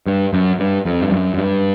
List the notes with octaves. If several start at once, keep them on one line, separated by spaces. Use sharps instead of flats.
G2
F#2
G2
F2
G2
F#2
F#2
G2